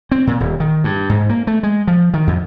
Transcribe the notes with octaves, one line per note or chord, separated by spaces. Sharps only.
C4
A#2
D#1
D#3
G2
G#2
A#3
A3
G#3
F3
D#3
F2